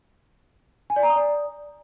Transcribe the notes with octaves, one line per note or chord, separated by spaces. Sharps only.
G#5
D5
A#5
D#6
D5